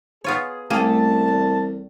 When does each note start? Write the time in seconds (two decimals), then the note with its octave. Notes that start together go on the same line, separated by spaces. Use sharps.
0.24 B3 F4 G#4 C#5
0.70 C2 A3 A#3 C#4 G4 G#4 A5
1.28 E2